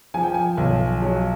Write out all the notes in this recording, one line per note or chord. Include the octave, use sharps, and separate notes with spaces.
F3 G#5
G5
G#5
B1
F#3